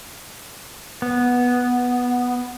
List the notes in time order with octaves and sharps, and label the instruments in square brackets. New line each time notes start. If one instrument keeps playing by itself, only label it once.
[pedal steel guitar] B3